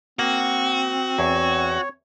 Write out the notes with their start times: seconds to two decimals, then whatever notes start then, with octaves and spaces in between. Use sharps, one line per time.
0.19 A#3 C4 F#4
1.19 E2 C#5